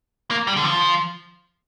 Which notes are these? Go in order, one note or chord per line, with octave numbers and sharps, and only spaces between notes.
A#3
G3
D3
F3